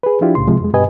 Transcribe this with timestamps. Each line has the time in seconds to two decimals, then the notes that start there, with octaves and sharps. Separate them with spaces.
0.03 G#4 B4
0.21 F3 D4 E4 F4 G4
0.35 C2 A2 C#3 C6
0.47 C3 F3 G#3
0.61 F2 G#3
0.74 G2 B2 G4 B4 D#5 G#5